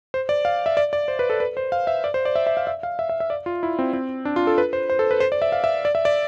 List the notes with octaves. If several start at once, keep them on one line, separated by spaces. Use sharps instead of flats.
C5
D5
F5
E5
D5
D5
C5
B4
A4
B4
C5
F5
E5
D5
C5
D5
E5
E5
F5
E5
F5
E5
E5
E5
D5
F4
E4
C4
C4
D4
F4
A4
B4
C5
C5
A4
B4
C5
D5
E5
F5
E5
D5
E5
D5